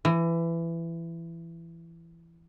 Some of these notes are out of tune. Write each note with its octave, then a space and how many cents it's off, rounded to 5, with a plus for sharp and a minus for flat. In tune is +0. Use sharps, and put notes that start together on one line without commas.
E3 +20